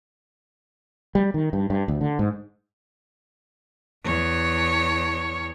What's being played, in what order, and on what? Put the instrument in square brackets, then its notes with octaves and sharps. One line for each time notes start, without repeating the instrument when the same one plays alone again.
[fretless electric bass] G3
D#3
G2
G2
D2
D3
G#2
[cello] E2 C#5